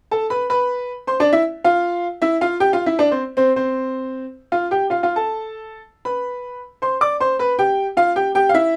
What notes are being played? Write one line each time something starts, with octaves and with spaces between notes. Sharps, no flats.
A4 A5
B4 B5
B4 B5
C5 C6
D4 D5
E4 E5
F4 F5
E4 E5
F4 F5
G4 G5
F4 F5
E4 E5
D4 D5
C4 C5
C4 C5
C4 C5
F4 F5
G4 G5
F4 F5
F4 F5
A4 A5
B4 B5
C5 C6
D5 D6
C5 C6
B4 B5
G4 G5
F4 F5
G4 G5
G4 G5
F5
E4 E5